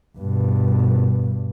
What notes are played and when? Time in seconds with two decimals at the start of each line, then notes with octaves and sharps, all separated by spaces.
0.18 G2 B2